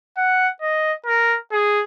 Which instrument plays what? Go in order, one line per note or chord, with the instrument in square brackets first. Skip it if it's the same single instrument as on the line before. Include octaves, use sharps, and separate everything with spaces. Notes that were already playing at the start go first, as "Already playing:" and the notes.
[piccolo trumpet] F#5
D#5
A#4
G#4